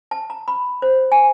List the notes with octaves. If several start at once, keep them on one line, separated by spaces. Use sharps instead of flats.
A5
A#5
B5
C5
G#5